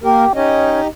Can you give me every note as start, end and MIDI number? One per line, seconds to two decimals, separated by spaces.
0.03 0.25 58
0.03 0.33 67
0.03 0.25 70
0.35 0.81 61
0.35 0.87 63
0.35 0.87 67
0.35 0.87 75